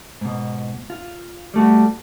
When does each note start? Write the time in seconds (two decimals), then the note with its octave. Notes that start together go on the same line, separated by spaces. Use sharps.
0.21 G#2 B2
0.90 F4
1.54 G3 A3 F#4